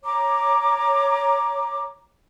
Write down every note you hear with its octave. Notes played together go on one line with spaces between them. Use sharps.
C#5 A#5 D6